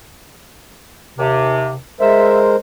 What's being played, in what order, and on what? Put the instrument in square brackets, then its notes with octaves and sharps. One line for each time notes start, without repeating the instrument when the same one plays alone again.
[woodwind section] D#2 C3
[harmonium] G#3 A#4 C5 [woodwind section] E5